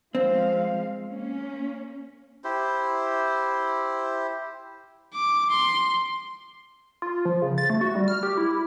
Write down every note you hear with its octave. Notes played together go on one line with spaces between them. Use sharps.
F3 G#3 C4 F5
A#3 C#4
E4 G4 C5
D6
C6
F4
F3
C#3
A6
A3
F#4
G3
F6
G4
E4